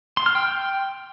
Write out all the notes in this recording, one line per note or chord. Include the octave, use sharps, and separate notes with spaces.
C6
F6
G5